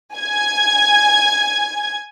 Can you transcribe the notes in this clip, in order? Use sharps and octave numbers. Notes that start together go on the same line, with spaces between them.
G#5 G#6